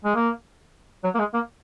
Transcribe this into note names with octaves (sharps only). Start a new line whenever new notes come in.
G#3
A#3
F#3
A#3
G#3
A#3